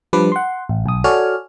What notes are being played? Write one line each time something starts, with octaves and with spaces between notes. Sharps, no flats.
F3 G3 D4 B4 D5
F#5 C6
A1
B1 D#6
F#4 A4 C#5 D5 G#5 F6